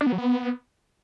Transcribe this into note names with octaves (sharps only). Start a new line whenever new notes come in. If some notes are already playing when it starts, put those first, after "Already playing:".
D4
B3
F#3
B3